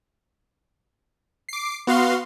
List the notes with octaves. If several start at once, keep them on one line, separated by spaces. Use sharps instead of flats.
D6 C7
B3 F#4 F5 C6